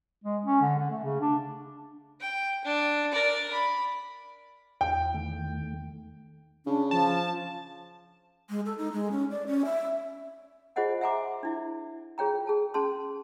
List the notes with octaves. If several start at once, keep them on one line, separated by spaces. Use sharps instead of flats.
G#3
C#4
D3
D3
A3
C#3
D4
G5
D4
A#4 D5
B5
E2 G5
D#3 A3
C#3 D4
F3 A5
G#3
A4
D#4
G#3
C#4
D5
C#4
E5
F4 G#4 C5 D#5 F#5 G#5
E5 F#5 G#5 A#5 C6 D6
D4 E4 E5
F4 G#4 C#5 G5 A#5
G#4 A5
C#4 G#4 A5 C6